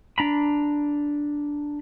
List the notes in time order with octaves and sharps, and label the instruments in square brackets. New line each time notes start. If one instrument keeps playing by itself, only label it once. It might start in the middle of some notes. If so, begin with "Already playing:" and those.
[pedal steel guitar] D4 A#5 B5